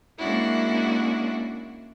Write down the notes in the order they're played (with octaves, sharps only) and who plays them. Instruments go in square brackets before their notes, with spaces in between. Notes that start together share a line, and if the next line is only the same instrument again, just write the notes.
[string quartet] G#3 A#3 C#4 D4 E4 F#4